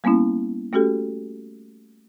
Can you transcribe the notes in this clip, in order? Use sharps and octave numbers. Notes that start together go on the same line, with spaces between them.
G3 A#3 B3 C#4 E4
A3 C#4 F#4 G4 A4